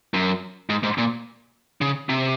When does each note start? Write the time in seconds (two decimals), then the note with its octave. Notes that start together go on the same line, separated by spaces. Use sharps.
0.14 F#2
0.70 G#2
0.83 G#2
0.98 A#2
1.81 C#3
2.09 C3